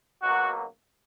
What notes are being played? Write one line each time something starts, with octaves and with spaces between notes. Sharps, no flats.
C#2 B2 F#3 A#3 F#4